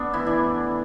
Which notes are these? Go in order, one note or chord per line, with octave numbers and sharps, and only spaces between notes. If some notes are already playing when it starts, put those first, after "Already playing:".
Already playing: A3 B3 D4
E3 E4
D4